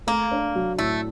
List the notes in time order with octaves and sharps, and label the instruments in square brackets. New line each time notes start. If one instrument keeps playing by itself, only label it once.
[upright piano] A3 [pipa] A#3
[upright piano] D4
F#3
[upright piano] A2 [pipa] A3